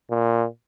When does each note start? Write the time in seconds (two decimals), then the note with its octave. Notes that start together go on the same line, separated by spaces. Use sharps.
0.10 A#2